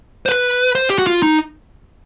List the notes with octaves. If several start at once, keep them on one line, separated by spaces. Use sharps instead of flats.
C5
B4
C5
G4
F#4
F4
D#4